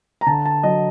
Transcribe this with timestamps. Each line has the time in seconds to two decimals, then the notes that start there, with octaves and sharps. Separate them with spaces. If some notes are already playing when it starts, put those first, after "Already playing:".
0.21 A#5
0.27 D3 A5
0.45 A5
0.63 F#3 D#5